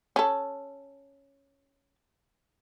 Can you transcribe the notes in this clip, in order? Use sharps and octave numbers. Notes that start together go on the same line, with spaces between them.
C#4 A4